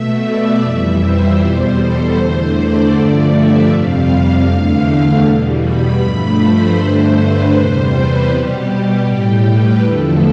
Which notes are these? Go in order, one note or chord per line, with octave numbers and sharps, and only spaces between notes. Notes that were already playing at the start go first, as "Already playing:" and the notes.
Already playing: B2 A3 E5
D5
F2 E3 G3 E5
C5
E2 B2 G3 C5
A4
E2 D3 A3 C5
D5
G2 D3 F3 A3
E5
F2 C3 G3 F5
E2 D3 A3
E2 B2 G3
B5
G2 F3 A3 B5
C5
G2 D3 A3
B4
E2 C3 G3 C5
B4
B2 G3 G4
A2 G3 G4
B4
E2 D3 F3 A3 A4